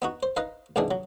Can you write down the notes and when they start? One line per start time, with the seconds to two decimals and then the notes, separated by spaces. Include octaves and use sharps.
0.02 B3 D#4 F#4
0.23 C5
0.37 D#4 B4 D#5 F5
0.76 C2 G#2 B2 E3 D4 G#4
0.91 F#3